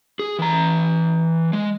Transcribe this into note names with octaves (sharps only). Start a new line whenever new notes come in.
G#4
E3 A#5
G#3